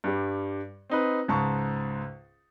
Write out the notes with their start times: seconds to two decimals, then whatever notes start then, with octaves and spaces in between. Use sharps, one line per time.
0.04 G2 G3
0.90 C4 D#4 B4
1.28 C#2 G#2 A5 C#6